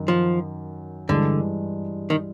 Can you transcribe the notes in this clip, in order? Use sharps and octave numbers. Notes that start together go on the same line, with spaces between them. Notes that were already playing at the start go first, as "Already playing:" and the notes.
Already playing: F#2 D#3
F3
G2 D3 E3 G#3
D#3